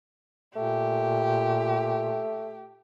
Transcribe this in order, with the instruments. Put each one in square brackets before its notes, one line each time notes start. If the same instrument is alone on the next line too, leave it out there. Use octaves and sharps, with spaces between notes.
[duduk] A#2 [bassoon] A3 [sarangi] G4